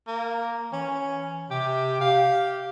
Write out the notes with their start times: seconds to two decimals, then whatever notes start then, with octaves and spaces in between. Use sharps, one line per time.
0.08 A#3
0.73 E3 C#4
1.51 C3 G4
2.01 G4 F5